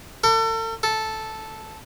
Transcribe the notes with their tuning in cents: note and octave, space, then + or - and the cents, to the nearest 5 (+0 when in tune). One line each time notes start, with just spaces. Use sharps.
A4 +40
A4 -5